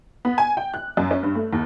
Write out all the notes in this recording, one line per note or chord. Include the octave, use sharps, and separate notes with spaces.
B3
G#5
G5
F#6
F#2
C#4
G2
A3
D#2